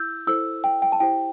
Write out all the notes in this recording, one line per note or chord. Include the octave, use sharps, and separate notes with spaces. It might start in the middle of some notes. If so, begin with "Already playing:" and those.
Already playing: E4 E6 G6
E4 A4 C5 E6
G5
G5
A5
E4 G4 C5 G5